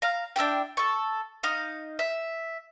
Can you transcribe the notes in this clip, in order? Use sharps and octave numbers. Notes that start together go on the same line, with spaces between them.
F5 A#5
D4 E4 G4 G5
A4 C#6
D#4 D#5 F5 D#6
E5